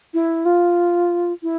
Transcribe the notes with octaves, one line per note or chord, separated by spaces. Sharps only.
E4
F4
E4